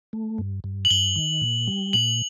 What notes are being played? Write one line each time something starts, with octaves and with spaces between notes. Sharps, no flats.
A3
G2
G2
F#7
G2 G7
D#3
A#2
G3
A#2 F#7